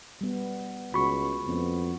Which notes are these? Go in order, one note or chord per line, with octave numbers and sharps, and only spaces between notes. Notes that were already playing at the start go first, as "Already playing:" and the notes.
G3 B3
C#2 F#4 B5 C#6
F2 G#3 B3 C#4